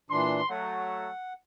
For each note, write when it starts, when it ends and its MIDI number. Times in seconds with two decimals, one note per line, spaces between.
0.10 0.42 46
0.10 0.42 52
0.10 0.42 62
0.10 0.47 84
0.50 1.09 54
0.50 1.09 57
0.50 1.33 78